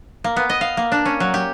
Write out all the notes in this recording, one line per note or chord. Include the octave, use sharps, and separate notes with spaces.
A#3
B3
D#5
F5
A#3
D4
C#4
F#3
G4